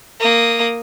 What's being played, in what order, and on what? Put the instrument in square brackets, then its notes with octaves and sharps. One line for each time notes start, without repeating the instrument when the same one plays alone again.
[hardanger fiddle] A#3 D#6